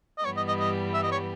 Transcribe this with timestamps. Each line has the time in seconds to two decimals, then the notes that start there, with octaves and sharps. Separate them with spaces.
0.18 D#5
0.25 G2 E3 G3 B3 G4 C#5
0.37 D#5
0.48 D#5
0.59 D#5
0.94 E5
1.03 D#5
1.12 C#5